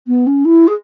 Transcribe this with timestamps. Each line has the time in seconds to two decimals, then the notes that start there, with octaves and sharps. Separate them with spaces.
0.07 B3
0.26 C#4
0.45 E4
0.67 G#4